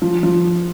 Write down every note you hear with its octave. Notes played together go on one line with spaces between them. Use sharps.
F3
F3